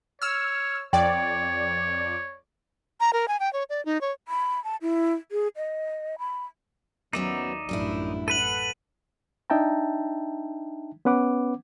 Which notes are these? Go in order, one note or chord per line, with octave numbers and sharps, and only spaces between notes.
C#5 E6 F6
F2 C#5 D5 G5
A#5
A#4
G#5
G5
C#5
D5
D#4
C#5
B5
A5
E4
G#4
D#5
B5
D#2 F#3 B3 C#4 D#4 D5 E5
A1 F#2 A2 G3 D4 E4
A4 B4 F#5 D#7 F#7
D4 D#4 E5 G5 A5 A#5
B3 C#4 B4 F#5 D6